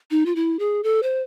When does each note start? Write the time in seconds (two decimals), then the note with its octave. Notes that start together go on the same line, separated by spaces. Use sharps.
0.11 D#4
0.26 F4
0.36 E4
0.59 G#4
0.83 A4
1.03 C5